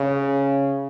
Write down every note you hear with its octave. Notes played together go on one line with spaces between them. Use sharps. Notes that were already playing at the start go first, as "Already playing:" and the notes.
Already playing: C#3